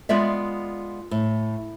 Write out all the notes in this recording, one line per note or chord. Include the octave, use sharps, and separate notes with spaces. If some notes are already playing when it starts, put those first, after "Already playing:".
G#3 B3 F4 D5 E5
A2